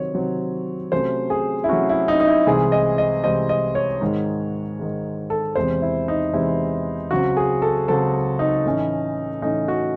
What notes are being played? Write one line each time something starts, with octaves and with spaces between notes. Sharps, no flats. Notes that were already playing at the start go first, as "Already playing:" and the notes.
Already playing: C3 D#3 F#3 C4 C#5
C3 D#3 F#3 C4
C3 F#3 A3 C#4 C5
G#4
E4
C3 F#3 A3 C#4 F#4
E4
D#4
D#4
E4
C2 C3 E3 G#3 C4 G#4
D#5
D#5
C2 C3 E3 G#3 C4 D#5
D#5
C#5
G#2 D#3 G#3
G#2 D#3 G#3
A4
E2 C3 E3 G#3 C4 C5
E4
D#4
E2 C3 E3 G#3 C4 E4
C#2 C#3 F#3 C4 F#4
G#4
A4
C#2 C#3 F#3 C4 A4
D#4
A2 E3 A3 C#4
A2 E3 A3 C#4 D#4
F#4